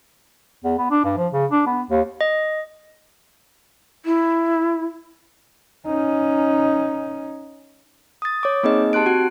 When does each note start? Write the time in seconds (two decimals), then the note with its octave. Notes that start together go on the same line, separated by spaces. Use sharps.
0.64 E2
0.78 B3
0.90 D4
1.04 G2
1.17 F3
1.32 C#3
1.51 D4
1.66 B3
1.90 D#2
2.21 D#5
4.05 E4
5.87 C#4 D#4
8.22 D#6 A6
8.43 C#5 D6
8.63 A#3 C4 D#4 G#4 D#5
8.93 G4 A5 C6 F#6 D7
9.06 C4 F#4 F#6